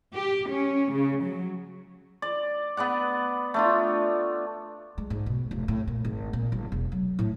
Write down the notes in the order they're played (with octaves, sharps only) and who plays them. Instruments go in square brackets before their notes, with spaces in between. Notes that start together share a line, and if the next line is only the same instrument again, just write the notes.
[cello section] G4
C#4
C#3
F#3
[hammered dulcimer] D5
B3 B4 D5 F#5
A3 D4 F4
[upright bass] G#3
G#2
B2
F1
A2
A#2
G#1
A#2
G1
E1
F#3
A2